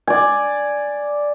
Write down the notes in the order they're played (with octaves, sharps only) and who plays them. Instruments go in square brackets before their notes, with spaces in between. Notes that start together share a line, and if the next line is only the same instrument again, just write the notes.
[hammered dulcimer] D5 G#5